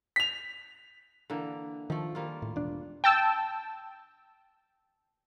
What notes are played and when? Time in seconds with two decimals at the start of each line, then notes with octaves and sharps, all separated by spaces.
0.16 B6 F7
1.30 D3 E3 A#3
1.90 D#3 F3 A3
2.15 G3 A#3 F4
2.42 A2
2.56 E1 D4
3.04 G5 A5 E6